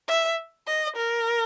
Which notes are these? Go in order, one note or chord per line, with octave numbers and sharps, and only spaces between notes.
E5
D#5
A#4